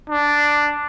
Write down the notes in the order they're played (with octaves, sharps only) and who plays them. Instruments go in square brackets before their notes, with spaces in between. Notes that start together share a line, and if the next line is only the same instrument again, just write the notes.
[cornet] D4